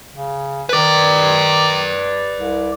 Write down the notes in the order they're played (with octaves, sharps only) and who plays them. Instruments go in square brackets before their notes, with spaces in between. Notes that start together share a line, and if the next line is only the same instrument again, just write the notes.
[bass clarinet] C#3
[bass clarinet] D#3 [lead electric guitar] B4 D5
[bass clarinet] C2